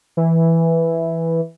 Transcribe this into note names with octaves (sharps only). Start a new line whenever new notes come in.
E3